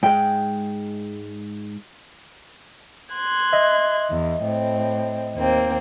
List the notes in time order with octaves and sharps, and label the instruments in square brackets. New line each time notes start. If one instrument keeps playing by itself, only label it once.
[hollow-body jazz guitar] G#2 G#3 [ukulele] G5
[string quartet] C6 F#6 G#6
[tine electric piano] D#5 E5
[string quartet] E2
A2 C4
D#2 A#3 C4